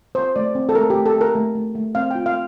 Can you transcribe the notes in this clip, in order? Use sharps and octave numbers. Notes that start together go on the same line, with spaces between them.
C4 C5
A3 D5
C4
A4
A3 A#4
G4
A3
A4
A3
A#4
A3
A3
A3
C4 F5
F4 G5
F5